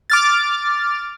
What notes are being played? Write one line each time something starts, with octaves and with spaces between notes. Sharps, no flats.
D6 F6 A6